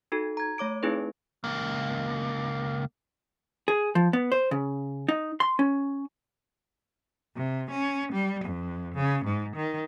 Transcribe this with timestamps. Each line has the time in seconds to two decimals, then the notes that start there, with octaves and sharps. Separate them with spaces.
0.12 D#4 F#4 A4
0.37 A#5 G#6
0.58 A3 C#5 D6 D7
0.83 A3 C4 D#4 E4 G#4 B4
1.44 C#2 A#3
3.68 G#4
3.95 F3
4.13 B3
4.32 C5
4.51 C#3
5.08 D#4
5.40 C6
5.59 C#4
7.35 C3
7.70 C#4
8.11 G3
8.45 F2
8.94 C#3
9.24 G#2
9.55 D#3